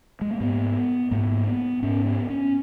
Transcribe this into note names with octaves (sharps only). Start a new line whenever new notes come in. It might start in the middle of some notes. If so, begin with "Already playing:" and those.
G#3
A#3
G#2 B3
G#2 A#3
B3
G#2 C#4
B3
C#4